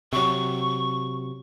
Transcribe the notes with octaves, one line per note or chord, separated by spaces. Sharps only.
C3 F#3 C#6